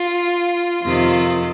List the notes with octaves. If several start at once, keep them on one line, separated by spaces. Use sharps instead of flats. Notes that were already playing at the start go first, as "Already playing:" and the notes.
Already playing: F4
F2 C3 D#3 F4